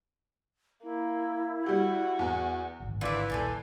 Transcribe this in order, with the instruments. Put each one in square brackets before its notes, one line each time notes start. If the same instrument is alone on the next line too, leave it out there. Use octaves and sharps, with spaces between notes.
[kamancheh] A#3 [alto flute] E4
[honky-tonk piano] G3 G4 [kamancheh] F#4
[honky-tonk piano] E2
[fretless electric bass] D1 G#1
[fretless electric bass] G#1 D3 [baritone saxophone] E3 [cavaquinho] F4 E5 [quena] D5
[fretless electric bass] D#1 A#1 [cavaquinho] A4 C5 D5 [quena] G#5